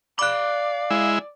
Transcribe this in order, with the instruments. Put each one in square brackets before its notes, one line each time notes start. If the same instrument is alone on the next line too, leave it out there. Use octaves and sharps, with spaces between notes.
[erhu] D5 [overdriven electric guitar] F5 B5 [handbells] D6 F#6
[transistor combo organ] G#3 E4